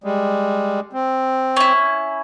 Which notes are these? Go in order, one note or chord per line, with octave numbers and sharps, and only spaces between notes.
G3 G#3
C4
C#4 E4